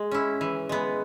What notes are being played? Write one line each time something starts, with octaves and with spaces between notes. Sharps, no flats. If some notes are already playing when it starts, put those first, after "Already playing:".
Already playing: G#3
C#4 E4
E3
G#3 B3